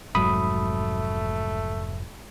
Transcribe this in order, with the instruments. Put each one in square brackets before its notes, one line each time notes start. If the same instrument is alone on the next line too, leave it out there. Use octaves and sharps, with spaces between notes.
[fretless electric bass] F1 G#2 F#3 [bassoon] A3 [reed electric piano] B5 D#6